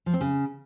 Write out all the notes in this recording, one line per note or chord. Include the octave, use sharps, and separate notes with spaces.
F3
C4
C#3